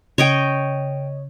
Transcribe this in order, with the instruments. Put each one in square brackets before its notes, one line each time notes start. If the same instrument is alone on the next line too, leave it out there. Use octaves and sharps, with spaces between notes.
[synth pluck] C#3 [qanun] C#5 D#5 G5